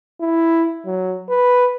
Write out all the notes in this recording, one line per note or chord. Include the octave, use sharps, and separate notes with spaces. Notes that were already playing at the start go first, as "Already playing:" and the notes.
E4
F#3
B4